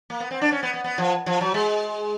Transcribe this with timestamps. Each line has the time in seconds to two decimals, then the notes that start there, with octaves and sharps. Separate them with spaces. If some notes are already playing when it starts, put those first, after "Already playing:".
0.10 A#3
0.20 B3
0.31 C4
0.41 D4
0.52 C#4
0.63 B3
0.74 B3
0.84 B3
0.98 F3
1.26 F3
1.41 F#3
1.54 G#3